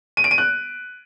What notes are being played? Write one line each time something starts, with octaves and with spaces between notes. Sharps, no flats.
D#7
D7
D#7
F#6